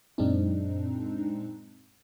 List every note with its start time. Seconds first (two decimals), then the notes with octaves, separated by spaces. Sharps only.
0.18 F#2 A#2 G#3 C4 D4 D#4